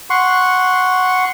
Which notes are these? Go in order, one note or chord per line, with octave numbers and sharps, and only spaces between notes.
F#5 C6 C#6